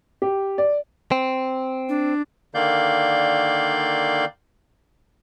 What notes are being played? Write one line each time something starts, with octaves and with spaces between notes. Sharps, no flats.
G4
D5
C4
D4
D3 D#3 A#3 D5 F5 G6